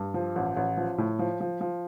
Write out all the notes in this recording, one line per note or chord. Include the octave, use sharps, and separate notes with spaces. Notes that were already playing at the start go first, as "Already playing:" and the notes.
Already playing: G2
F3
A1
A1
F3
A2
F3
F3
F3